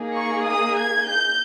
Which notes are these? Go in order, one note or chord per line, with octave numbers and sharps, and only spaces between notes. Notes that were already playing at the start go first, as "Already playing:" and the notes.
Already playing: A#3 D#4 G#4
C#6
D#6
G#6
G6